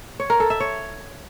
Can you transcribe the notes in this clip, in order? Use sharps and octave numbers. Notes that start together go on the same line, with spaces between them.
C#5
A#4
A4
E5
C#5